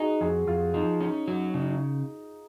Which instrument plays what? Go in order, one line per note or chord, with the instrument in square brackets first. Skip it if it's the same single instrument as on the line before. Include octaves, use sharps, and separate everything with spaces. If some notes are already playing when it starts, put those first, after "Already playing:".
Already playing: [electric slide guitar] D#4 [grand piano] F#4 G#4
[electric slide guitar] F2 [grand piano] G#4
[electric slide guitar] F2 [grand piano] F4
[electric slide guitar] F3 [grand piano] D#4
[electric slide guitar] C#4 [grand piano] D#4
[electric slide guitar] F#3
C#3